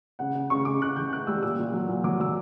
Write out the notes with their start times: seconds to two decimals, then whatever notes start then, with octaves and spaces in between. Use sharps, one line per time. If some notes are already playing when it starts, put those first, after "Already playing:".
0.19 C#3 F#5
0.35 C#3
0.50 C#3 C#6
0.65 C#3 D6
0.81 C#3 F#6
0.96 E3 G6
1.12 C#3 F#6
1.27 G3 E6
1.43 A#2 E6
1.59 A#2
1.74 F#3
1.89 A#2
2.04 F#3 D6
2.20 F#3 E6